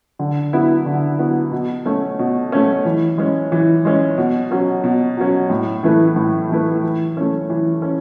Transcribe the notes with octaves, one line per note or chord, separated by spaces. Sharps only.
D3
F#3 B3 E4
D3
F#3 B3 E4
B2
A3 C#4
B2
A3 C#4
E3
G#3 C#4
E3
G#3 C#4
B2
F#3 C#4
B2
F#3 C#4
A2
E3 A3 E4 B4
A2
E3 A3 E4 B4
E3
A3 C#4
E3
C#4